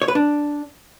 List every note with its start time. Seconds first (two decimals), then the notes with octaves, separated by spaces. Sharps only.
0.02 C#5
0.08 B4
0.15 D4